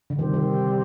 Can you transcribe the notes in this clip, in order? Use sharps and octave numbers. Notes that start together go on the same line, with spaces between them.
D3
C3 D#3 G3 C4 G4
D#3